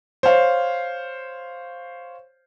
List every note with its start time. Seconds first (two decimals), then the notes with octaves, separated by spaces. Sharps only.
0.23 C5 C#5 F5